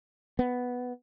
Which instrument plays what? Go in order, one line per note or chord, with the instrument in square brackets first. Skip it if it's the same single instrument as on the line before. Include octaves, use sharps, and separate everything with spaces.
[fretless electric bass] B3